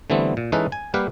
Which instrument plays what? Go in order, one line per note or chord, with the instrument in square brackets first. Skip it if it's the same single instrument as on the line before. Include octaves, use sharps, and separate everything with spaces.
[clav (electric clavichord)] D3 E3 G3 A3 B3 C4
A#2
E3 G#3 C#4 D#4 A4 B4
G#5
G3 A#3 G4 B4 F5 F#5